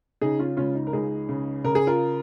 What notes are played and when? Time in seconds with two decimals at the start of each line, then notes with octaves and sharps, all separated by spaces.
0.21 C#3 D#4 G#4
0.39 C#4 F4
0.57 C#2 C#4 F4
0.75 D#4
0.87 A#4
0.93 C#2 D#4 G#4
1.29 C#3
1.64 C#3 A#4
1.75 G#4
1.87 F4 A#4